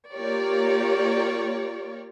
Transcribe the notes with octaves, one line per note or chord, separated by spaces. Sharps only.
A#3 F4 G4 A#4 C#5 D5